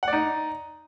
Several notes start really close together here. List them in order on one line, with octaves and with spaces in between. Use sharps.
F#5 D5 D#4